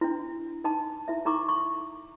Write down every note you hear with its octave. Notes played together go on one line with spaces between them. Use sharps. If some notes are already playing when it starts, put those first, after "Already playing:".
D4 E4
D#4 G#5 A5
E4 E5
D#4 E4 A#5 C#6 D6
C#6